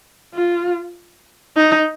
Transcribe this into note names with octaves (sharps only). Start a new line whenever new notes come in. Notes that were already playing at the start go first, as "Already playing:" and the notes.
F4
D#4